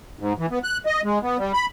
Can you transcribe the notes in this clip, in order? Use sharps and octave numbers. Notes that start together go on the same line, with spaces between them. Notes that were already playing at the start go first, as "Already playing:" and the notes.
G#2
E3
B3
F#6
D#5
G#3
B3
G3
B5